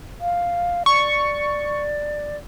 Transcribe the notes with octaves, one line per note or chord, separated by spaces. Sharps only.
F5
D5 C#6